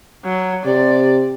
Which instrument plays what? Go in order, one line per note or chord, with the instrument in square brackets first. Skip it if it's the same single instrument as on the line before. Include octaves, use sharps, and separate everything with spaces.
[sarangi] F#3
[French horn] C3 [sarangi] D5